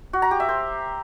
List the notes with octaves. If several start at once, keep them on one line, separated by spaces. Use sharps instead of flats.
F#4
A#5
G4
E5
C5